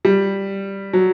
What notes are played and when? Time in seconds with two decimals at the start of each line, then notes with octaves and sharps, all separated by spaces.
0.05 G3
0.93 F#3